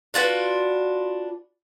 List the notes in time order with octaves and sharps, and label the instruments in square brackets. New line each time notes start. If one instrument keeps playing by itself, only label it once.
[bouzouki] D4 F4 F#4 B4